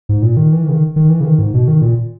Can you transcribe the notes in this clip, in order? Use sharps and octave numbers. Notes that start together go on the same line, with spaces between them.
G#2
A#2
D#3
E3
D#3
C#3
D#3
D#3
E3
C#3
D#3
G#2
B2
D#3
A#2